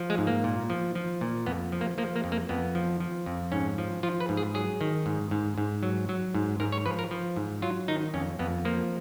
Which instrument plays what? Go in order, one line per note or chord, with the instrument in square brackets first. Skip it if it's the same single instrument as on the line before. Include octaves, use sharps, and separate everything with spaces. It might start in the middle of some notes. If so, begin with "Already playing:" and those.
Already playing: [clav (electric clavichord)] F3
G#3
G#2
A#3
A#2
F3
F3
A#2
F2 B3
F3
A#3
F3 A#3
A#3
F2
A#3
F2 B3
F3
F3
F2
G#2 C#4
F3
F3 F4
B4
G#2
G#4
F#3 G#4
D#3
G#2
G#2
G#2
F#3
F#3
G#2
G#2 A#4
C#5
F3 B4
A#4
F3
G#2
F#3 F4
D#3 D#4
F2 C#4
F2 B3
F3 A#3